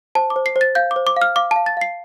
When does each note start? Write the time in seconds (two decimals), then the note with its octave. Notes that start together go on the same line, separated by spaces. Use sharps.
0.15 C5 A5
0.30 D6
0.36 C5
0.46 C7
0.56 C5
0.61 A6
0.75 F5 G6
0.91 D6
0.96 C5
1.07 D6
1.16 F5
1.22 F6
1.36 F5 D6
1.51 F5 A5
1.66 A6
1.77 F5 C7